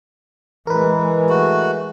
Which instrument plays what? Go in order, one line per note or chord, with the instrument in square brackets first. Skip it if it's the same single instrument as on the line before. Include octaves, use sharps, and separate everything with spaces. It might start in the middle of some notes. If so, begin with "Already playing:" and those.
[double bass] E3 G#3 [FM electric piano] A#4 B4
[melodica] A3 F#4